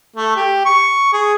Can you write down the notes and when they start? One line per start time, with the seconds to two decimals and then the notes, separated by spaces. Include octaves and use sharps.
0.16 A3
0.36 G4
0.66 C#6
1.13 G#4